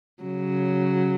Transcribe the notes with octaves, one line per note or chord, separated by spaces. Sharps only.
C#3 F#3